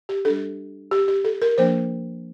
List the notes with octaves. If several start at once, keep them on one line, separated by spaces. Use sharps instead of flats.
G4
G3 D4 A4
G4
G4
A4
A#4
F3 A#3 D4 C5